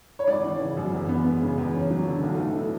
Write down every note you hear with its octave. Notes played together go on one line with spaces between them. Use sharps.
C#5
G#1 D5
E3
C#3
F#2
E2
B3
G#3
C#3
E2
C#4
F#3
D3
B1
A3
E3